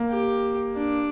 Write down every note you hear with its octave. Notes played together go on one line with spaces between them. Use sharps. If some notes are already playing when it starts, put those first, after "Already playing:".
Already playing: A#3
G4
D4